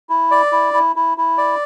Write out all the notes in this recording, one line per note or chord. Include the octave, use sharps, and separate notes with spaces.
E4
D5
E4
E4
E4
E4
D5